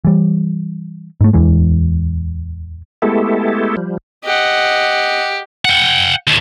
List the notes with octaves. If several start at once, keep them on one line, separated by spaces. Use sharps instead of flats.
E3 G3
G#2 A3
D1 E2 E3 G#3
G#3 A3 B3 E4 G4 A4
F3 G3
G4 D#5 F#5
F#5 G5
D#2 A2